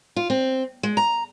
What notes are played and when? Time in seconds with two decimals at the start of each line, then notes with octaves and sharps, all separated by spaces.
0.16 F4
0.30 C4
0.83 G#3
0.97 A#5